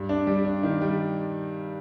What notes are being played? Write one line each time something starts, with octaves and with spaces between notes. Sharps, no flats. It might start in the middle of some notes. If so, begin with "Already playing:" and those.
Already playing: G2
D4
G3
D4
D#3
G3